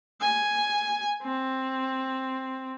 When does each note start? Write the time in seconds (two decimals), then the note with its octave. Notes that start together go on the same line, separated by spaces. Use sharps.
0.21 G#5
1.23 C4